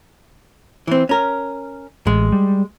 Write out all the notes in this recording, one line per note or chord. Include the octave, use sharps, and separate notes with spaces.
E3 C4
C#4 A#4
A1 G#3
G3